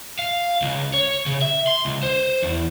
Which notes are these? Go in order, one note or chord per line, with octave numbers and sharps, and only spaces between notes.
F5
C#2
C#5
C#3
E5
C6
C#2
C5
E2